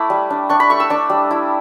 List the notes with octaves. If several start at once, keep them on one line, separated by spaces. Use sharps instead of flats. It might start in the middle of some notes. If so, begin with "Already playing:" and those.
Already playing: A3 E4 B5 D6
G3
D4
D4 C#6
B5
A3 C#6
E6
D4 D6
G3
E4